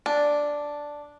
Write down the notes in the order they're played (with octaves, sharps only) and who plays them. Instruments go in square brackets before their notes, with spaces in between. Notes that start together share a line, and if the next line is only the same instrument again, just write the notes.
[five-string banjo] D4